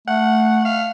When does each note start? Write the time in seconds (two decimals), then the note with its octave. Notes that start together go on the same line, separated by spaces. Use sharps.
0.08 A3 F#5
0.65 F5